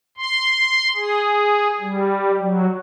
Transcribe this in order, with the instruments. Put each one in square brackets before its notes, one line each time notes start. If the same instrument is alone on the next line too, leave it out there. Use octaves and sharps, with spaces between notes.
[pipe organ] C6
G#4
G3
F#3